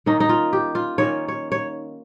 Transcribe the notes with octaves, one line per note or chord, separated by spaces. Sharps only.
D#3 A#3 C#4 D#4
D#4
F4
G4
F4
D#3 A#3 C#4 C#5
C#5
C#5